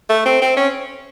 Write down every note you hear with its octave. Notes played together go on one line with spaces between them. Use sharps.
A3
C4
C4
C#4